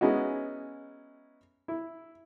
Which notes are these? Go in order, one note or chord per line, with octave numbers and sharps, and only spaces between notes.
G#3 B3 C#4 D#4 E4 F#4
E4